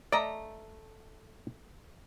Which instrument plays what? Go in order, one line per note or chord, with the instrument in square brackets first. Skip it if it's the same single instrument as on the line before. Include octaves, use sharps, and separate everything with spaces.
[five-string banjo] A3 A#5 [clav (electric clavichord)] D5 D#5